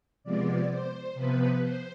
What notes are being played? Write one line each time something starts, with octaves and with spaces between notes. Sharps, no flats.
C3 F3 G#3 B3 D5
C5
C3 F3 B3 B4
C5